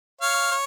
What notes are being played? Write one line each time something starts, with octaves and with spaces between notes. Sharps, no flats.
C#5 F5
C#5